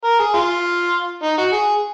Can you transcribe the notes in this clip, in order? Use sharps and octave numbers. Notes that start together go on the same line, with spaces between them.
A#4
G#4
F4
D#4
F#4
G#4